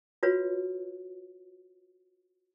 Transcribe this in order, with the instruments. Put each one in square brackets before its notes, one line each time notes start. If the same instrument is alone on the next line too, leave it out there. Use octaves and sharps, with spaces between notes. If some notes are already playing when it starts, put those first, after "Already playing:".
[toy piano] F4 F#4 B4 C#5